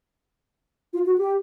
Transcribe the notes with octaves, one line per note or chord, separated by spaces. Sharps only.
F4
F#4
G4